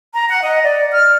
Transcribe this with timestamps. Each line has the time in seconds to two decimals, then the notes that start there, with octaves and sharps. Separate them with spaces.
0.12 A#5
0.29 F#5
0.42 D#5
0.63 D5
0.93 F6